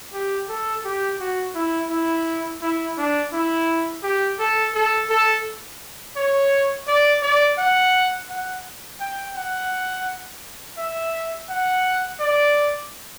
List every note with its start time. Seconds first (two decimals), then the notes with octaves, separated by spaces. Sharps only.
0.14 G4
0.49 A4
0.85 G4
1.20 F#4
1.55 E4
1.90 E4
2.62 E4
2.98 D4
3.33 E4
4.03 G4
4.40 A4
4.75 A4
5.10 A4
6.16 C#5
6.88 D5
7.23 D5
7.58 F#5
8.30 F#5
9.00 G5
9.36 F#5
10.78 E5
11.49 F#5
12.20 D5